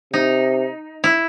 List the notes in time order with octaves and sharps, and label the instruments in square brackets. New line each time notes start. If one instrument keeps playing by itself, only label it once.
[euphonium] C3 [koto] D#4
[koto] E4